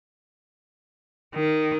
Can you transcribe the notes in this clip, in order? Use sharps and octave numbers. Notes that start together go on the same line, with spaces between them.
D#3